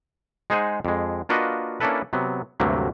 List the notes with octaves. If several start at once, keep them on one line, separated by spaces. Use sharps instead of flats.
G#3 D#4 G#4 C5 F#5 G#5
F2 G#3
A#3 D4 F4 F#4 B4 D#5
A#3 C#4 D4 E4 A4 B4
C3 F#3 B3
D2 G2 C3 F#3 A3 A#3